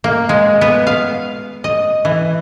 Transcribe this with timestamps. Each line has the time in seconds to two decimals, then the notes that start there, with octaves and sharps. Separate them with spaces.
0.04 A#3
0.29 G#3
0.61 B3
0.87 F5
1.64 D#5
2.05 E3